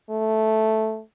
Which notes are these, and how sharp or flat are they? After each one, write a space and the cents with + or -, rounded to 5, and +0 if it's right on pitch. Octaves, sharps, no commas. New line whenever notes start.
A3 -5